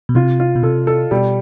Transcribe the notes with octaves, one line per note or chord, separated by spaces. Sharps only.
B2
C3 F4
F4
B2
C3 A4
A4
B2 G3